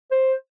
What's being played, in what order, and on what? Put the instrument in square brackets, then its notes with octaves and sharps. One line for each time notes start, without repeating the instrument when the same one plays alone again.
[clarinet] C5